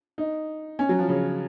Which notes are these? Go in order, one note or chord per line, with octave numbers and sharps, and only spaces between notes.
D#4
C#4
F#3
F3
C#3